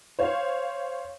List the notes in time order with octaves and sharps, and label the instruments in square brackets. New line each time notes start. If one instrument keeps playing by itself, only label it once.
[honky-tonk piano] C5 C#5 F5